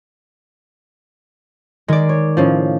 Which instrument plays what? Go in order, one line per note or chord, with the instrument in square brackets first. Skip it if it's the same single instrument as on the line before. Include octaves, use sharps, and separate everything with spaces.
[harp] D#3 D5 [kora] G#3
[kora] C#5
A2 C#3 F3